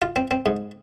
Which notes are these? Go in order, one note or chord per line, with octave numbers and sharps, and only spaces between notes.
F4
C4
C4
G#2